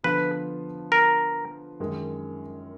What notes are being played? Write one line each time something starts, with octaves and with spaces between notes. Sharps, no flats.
D3 F3 B3 F4 B4
A#4
F#2 D#3 G#3